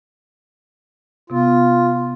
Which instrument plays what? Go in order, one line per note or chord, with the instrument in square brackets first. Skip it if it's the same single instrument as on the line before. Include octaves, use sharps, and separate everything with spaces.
[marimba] C3 B3 [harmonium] F4